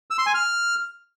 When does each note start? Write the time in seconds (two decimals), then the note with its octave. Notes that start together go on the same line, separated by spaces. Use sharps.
0.10 E6
0.18 C6
0.26 G#5
0.34 F6